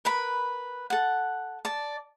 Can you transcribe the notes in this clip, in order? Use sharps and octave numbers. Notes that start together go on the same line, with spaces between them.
A#4 B4 B5
A4 F#5
D5 A5